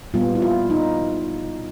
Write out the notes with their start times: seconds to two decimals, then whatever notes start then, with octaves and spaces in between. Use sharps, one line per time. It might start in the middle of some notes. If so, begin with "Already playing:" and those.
0.14 A#2 G3 B3 F4
0.35 E4
0.42 F4
0.70 D#4